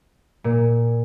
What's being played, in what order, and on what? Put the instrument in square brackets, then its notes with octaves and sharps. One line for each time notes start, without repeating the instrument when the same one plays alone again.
[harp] A#2